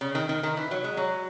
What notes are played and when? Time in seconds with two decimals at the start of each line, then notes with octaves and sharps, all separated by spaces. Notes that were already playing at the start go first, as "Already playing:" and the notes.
0.01 C#3
0.15 D#3
0.29 D#3
0.43 D#3
0.57 E3
0.71 F#3
0.84 G#3
0.97 F#3